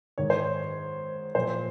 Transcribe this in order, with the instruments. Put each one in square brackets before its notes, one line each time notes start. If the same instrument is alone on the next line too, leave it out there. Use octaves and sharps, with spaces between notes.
[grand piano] G#2 D#3 C#5
C5
C#5
A#2 F3 C5